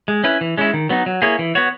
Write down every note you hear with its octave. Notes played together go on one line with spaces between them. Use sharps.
G#3
C#4 E4 B4
E3
G#3 C#4 E4
D#3
F#3 B3 D#4
F#3
A#3 E4 G#4 C#5
E3
B3 F#4 C#5